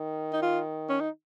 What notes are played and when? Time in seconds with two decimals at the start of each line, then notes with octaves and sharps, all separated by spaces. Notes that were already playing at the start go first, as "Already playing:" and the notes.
Already playing: D#3
0.33 D#4
0.42 F4
0.89 C#4
1.00 D#4